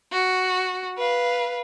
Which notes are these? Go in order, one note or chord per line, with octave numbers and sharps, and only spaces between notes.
F#4
B4 F5